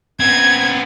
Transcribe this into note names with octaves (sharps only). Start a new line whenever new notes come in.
B3 C4 G#6